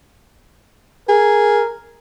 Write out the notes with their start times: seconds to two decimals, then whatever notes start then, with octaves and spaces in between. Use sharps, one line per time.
1.09 G#4 A#4